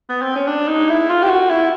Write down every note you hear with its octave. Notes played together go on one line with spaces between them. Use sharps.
B3
C4
C#4
D4
D#4
E4
F4
G4
F#4
E4